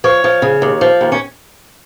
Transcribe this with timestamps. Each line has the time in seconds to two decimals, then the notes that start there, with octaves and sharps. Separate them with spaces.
0.04 F3 C#5
0.24 F3
0.42 C#3
0.62 D#2
0.81 F3
1.01 D#2
1.12 C#4